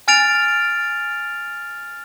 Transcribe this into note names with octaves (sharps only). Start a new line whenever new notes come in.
G#5 F6 A6 D7 F7